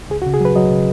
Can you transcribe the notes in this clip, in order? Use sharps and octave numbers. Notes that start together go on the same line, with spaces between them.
C#2 G#4
F#4
C#3
G#4
F#3 B4
F#3 D#5
C#3